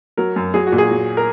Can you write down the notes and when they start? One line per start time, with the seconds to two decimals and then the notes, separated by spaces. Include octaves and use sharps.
0.17 F#3 A#4
0.36 F#2
0.54 F#3 G#4
0.67 F#4
0.72 A#2
0.78 G#4
0.91 F#3
1.17 A#4